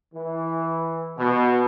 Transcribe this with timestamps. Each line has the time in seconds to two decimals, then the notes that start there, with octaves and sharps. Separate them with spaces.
0.13 E3
1.17 B2